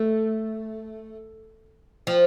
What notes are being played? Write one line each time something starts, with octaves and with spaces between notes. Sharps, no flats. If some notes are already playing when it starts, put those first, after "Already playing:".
Already playing: A3
F3